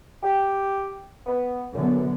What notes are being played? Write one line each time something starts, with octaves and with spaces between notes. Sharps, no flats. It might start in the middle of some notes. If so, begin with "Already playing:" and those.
G4
B3
F#2 D3 F#3 B3